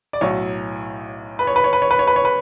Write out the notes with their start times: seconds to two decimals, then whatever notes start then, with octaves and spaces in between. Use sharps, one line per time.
0.13 D5
0.21 B1 A2 F#3 C#5
1.39 B4
1.47 C#5
1.56 B4
1.64 C#5
1.73 B4
1.82 C#5
1.91 B4
1.99 C#5
2.07 B4
2.16 C#5
2.25 B4